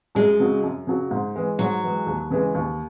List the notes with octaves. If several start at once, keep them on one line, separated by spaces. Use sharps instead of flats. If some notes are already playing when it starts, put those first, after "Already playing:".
F#2 G#3
C#3 F#3
F#2
C#3 F#3
G#2
E3 G#3
G#2 F#3
E3 G#3
D#2
C#3 E3 G#3
D#2